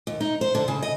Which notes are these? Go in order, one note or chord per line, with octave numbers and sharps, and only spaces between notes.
D#2
D#4
C5
D3
C#3
D#5